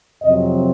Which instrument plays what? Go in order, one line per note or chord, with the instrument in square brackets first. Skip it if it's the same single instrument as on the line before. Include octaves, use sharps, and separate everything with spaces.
[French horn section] F2 C3 F#3 C4 D#5